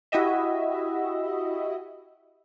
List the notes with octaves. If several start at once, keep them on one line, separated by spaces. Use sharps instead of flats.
E4 F#4 G4 D#5 E5